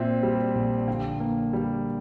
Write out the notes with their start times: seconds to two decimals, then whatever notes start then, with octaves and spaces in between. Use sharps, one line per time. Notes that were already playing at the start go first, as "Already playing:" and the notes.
Already playing: A#2 C4 E5
0.23 G3
0.55 A#1
0.88 D3 F5 G5
1.20 A#3
1.53 G3